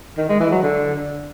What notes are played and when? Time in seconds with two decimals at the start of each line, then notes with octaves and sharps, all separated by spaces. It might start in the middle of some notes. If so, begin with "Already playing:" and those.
0.17 D#3
0.29 G#3
0.40 E3
0.51 F#3
0.63 D3